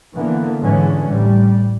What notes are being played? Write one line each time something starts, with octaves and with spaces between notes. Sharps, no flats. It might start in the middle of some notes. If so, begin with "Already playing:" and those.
D3 E3 A#3 B3
G#2 D3 E3 G#3 C#4
A1 G3